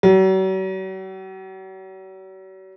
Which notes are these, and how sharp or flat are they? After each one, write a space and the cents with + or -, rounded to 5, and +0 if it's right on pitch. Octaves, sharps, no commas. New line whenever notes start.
F#3 +45